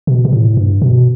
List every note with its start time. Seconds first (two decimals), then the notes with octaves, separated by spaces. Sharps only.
0.07 B2
0.25 B2
0.33 A2
0.57 G2
0.82 B2